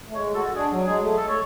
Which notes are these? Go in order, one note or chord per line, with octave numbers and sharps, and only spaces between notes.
A3
G#3 C#5
F#4 A4
D4 G#4
F#3
G#3 G#4
A3
A4
C#5